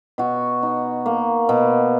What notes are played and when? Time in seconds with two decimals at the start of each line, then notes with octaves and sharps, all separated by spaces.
0.18 B2 F#4
0.63 D#4
1.06 A#3
1.49 B2